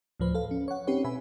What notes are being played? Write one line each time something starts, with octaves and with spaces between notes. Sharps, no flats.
D2 A2 F3 B4 C5
A4 B4 F5
C#4
C#5 F#5
C4 C#4 D#4 G4 B4 C#5
B2 B4 E5 G#5 B5